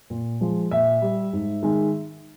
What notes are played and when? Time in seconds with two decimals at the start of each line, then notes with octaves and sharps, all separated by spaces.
0.10 A#2
0.40 F3 G#3
0.71 A#2 E5
1.02 G3
1.33 G#2
1.63 D#3 G#3